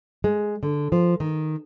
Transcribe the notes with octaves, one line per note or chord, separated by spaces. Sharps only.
G#3
D3
F3
D#3